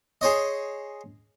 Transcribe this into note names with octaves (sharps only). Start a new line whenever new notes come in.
G#4 C5 C#5 D#5